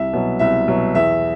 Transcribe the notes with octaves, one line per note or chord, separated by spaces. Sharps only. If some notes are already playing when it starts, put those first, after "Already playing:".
Already playing: C2 E5
B2 F#3
C2 E5
B2 F#3
E2 E5